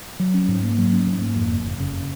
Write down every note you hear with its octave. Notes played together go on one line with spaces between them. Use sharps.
F#3
C#4
G#2
A#3
F#3
C#4
G#2
A#3
F2
F#1
F#1
C#3